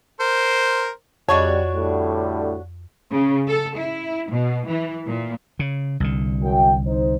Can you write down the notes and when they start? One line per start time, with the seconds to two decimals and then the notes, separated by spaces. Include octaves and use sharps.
0.20 A#4 C5
1.28 F2 C#3 G3 D4 F#4 C#5 D#5
1.73 A2 D3 G3
3.11 C#3
3.48 A4
3.77 E4
4.31 B2
4.68 E3
5.06 A#2
5.59 C#3
6.00 C2 D3
6.43 F#2 G5
6.86 D#4 C5